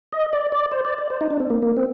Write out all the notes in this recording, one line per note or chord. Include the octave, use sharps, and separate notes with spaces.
D#5
D5
D5
C5
D5
D5
C5
D#4
D4
C4
A#3
A#3
C4